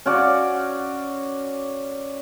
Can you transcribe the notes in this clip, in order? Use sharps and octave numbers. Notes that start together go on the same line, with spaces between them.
C#4 F#4 D5